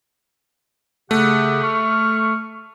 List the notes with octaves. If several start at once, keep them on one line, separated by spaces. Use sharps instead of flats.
C#3 A3 G4 F#5
C#6 F6